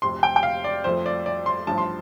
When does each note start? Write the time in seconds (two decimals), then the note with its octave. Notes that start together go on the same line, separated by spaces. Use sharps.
0.02 F1 F2 C3 C6
0.23 G5
0.36 G5
0.43 F5
0.64 D5
0.84 F2 F3 A3 C5
1.06 D5
1.26 D5
1.46 C6
1.67 A1 G2 F3 A5
1.78 C6